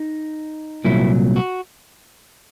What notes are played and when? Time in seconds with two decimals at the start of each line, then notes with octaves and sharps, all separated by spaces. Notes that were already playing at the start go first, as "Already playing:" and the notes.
Already playing: D#4
0.85 C2 A#2 F#3 E4
1.36 F#4